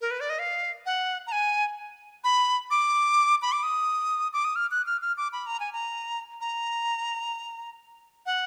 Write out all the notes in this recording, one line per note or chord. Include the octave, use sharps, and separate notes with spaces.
A#4
B4
D5
D#5
F5
F#5
A#5
G#5
B5
D6
B5
D6
D#6
D6
D#6
F6
F#6
F6
F6
D6
B5
A#5
G#5
A#5
A#5
F#5